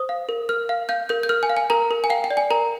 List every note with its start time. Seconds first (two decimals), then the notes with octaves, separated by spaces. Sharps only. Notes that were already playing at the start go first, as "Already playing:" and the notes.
Already playing: C5 D#6
0.09 F5
0.29 A#4
0.49 A#4 F6
0.69 F5
0.89 F5 G6
1.09 A#4 G6
1.23 G6
1.29 A#4 F6
1.43 G#5
1.49 F5
1.57 G#5
1.70 A#4 A#5
1.91 A#4
2.04 G#5
2.10 F5 G5
2.24 G5
2.30 D5
2.37 G#5
2.50 A#4 A#5